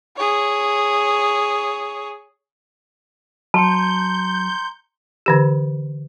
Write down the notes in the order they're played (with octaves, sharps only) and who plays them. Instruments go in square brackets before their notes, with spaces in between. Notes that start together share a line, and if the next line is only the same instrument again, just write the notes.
[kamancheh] G#4 C#5
[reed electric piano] F#3 [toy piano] A5 [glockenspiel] A#5 C6 C#7 [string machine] G6
[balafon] D3 E3 G4